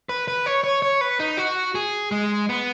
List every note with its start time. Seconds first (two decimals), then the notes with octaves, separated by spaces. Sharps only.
0.09 B4
0.28 B4
0.46 C#5
0.64 C#5
0.82 C#5
1.01 B4
1.20 D#4
1.37 F#4
1.75 G#4
2.12 G#3
2.49 B3